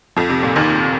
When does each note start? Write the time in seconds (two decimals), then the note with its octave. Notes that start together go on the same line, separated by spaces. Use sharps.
0.16 F2 F3
0.30 C3
0.43 A#2
0.56 D#2 D#3